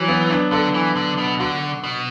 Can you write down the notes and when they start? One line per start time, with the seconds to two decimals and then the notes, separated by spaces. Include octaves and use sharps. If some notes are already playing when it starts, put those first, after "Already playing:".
Already playing: E3 F#3
0.08 B3
0.31 D4
0.52 D3 A4
0.74 E3
0.96 D3
1.18 B2
1.39 D3 F#4
1.84 B2